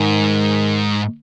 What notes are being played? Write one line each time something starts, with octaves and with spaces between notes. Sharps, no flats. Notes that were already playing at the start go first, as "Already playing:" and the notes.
Already playing: G#2 D#3